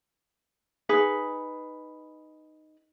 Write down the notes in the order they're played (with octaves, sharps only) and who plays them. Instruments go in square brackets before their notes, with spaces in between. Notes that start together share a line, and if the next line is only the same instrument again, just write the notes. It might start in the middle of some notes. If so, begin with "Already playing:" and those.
[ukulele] D#4 G#4 B4